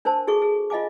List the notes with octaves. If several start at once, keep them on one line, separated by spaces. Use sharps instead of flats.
D4 A#4 C5 A5
F#4 G#4 A4 C#6
G#4
F4 D#5 F5 G#5 D6